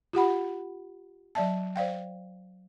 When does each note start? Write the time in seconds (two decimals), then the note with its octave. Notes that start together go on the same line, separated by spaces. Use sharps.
0.13 F4 G4 F#5 B5
1.35 F#3 D5 E5 A5
1.76 C5 D5 F5 G5